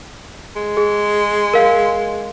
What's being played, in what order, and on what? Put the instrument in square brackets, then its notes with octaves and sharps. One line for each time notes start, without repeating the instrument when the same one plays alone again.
[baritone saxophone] G#3
[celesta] G#4
A#4 F5